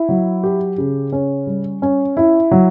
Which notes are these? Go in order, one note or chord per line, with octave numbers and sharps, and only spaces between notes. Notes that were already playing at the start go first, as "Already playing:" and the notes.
Already playing: E4
F#3
G4
C#3
C#4
G3
C#4
E4
F#3